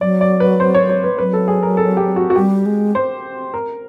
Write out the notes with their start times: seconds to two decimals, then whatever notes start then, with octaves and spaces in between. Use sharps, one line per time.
0.01 F#3 D5
0.21 D5
0.40 B4
0.60 C5
0.75 C#5
0.89 C#5
1.04 B4
1.18 F#3 B4
1.33 A4
1.48 G#4
1.63 A#4
1.77 A4
1.97 G4
2.16 F#4
2.30 F#4
2.36 G3 G4
2.66 G#3
2.95 C5
3.54 A#4